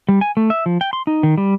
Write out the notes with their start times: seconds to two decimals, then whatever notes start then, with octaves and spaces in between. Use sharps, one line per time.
0.09 G3
0.21 G#5
0.37 A3
0.50 E5
0.66 F3
0.81 G5
0.93 C6
1.07 D#4
1.23 D#3
1.38 G3